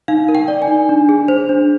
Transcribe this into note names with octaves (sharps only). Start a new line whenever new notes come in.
D#4 F5
A#4
G5
D5
G#5
D#4
D4
G#4
C5
D4